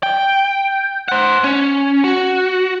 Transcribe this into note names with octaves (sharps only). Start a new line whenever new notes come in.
G5
C5 F#5
C#4
F#4